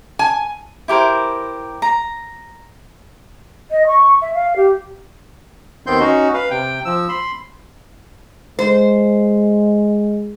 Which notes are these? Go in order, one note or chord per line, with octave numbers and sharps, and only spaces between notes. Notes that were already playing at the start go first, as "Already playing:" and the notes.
G#5
E4 G4 A#4 C5
A#5
D#5
C#6
E5
F5
G4
D#2 D#3 B3 C4 C6 G6
C#4 D#4 F#4
B4 F5
C3 G5
F3 E6
B5 C6
G#3 C5